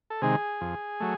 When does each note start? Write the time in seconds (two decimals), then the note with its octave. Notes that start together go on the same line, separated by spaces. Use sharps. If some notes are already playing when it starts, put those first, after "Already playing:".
0.10 A4
0.22 C3 D#3 G#3 G#4
0.61 F2
1.00 F#3 A3